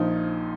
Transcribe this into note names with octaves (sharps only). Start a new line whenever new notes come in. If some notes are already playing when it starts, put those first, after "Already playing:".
Already playing: A#1 A#2 F3 D#4